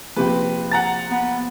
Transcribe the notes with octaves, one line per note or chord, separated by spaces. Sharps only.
A#1 C3 B4 G5
F#5 A#5 A6
B3